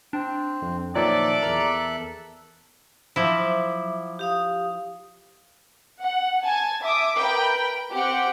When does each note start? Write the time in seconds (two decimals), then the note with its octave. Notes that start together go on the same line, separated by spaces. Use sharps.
0.13 C4 D4
0.62 F2
0.95 A#2 D#3 F3 F#3 A4 D5 E5 F#6
1.43 E2 A#4 A#5
3.16 F3 F#3 E4 E5 D6
4.19 G4 F5 D#6
6.01 F#5
6.43 G#5 A5
6.83 E5 D6 D#6
7.17 A#4 B4 G5 B5
7.92 C4 G4 F#5 G5